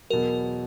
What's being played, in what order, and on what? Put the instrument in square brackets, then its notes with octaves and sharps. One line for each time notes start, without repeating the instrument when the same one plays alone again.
[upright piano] E2 B2 F#3 [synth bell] A#4